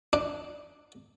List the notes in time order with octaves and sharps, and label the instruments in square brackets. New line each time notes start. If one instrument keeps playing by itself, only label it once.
[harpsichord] D4